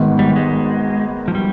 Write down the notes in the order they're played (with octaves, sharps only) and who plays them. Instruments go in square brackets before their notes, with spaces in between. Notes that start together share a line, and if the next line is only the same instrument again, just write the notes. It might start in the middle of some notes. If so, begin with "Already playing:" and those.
Already playing: [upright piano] G#1 G#2 D#3 B3
[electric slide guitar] G3
G#3
F3
G3